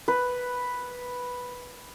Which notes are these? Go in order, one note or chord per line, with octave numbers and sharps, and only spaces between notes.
B4